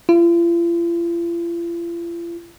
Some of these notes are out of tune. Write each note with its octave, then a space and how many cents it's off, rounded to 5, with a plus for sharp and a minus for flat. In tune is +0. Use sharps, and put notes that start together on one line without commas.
F4 -45